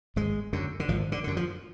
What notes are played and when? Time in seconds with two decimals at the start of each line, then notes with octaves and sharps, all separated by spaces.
0.16 G#1 G#3
0.53 F#2 D3
0.80 D3
0.88 G#1 F3
1.12 D3
1.24 F#2 D3
1.37 F3